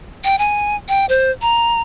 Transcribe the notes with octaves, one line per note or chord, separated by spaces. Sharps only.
G5
G#5
G5
C5
A#5